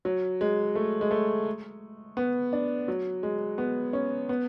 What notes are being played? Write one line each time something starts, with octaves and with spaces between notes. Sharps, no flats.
F#3
G#3
A3
G#3
A3
B3
D4
F#3
G#3
B3
C#4
B3